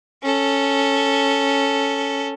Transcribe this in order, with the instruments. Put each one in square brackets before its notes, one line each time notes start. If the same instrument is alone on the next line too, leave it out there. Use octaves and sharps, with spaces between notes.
[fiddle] C#4 A4